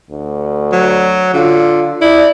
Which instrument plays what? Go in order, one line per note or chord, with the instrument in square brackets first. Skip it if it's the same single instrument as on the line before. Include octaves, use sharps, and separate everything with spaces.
[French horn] D2
[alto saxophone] F#3
[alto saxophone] D3 [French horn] F4
[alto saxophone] E4 [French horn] D5